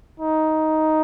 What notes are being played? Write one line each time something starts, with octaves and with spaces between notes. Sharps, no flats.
D#4